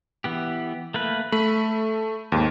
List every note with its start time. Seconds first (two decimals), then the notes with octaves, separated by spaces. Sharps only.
0.24 E3 B3 G4
0.94 A3 A#3 B4
1.32 A3 B5
2.32 D#2 G#2